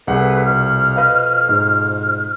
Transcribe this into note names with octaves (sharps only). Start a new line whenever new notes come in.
C2 G#4 A4 B4 F#5
F2 B2 F6
B4 D#5 F5
G#2